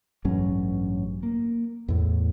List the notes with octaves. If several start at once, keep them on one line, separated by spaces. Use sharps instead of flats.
A1 G2 F#3 C#4
A#3
E2 A2